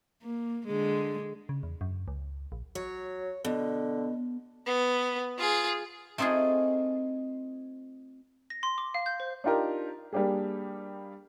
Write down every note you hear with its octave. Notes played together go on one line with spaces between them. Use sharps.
A#3
D3 G#3
C#3
E2
F#2
C#2
A#1
F#3 C#5
B2 D3
B3
F4 G#4
A3 C4 D#4 F4 G#4
A#6
C6
D6
F5
G6
C5
D4 D#4 F4 G4 A#4
G3 A#3 D4 G4 G#4